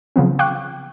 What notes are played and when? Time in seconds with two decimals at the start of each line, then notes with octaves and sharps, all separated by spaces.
0.16 C#3 F3 F#3 B3 C4
0.39 F5 G5 C#6 D6 F#6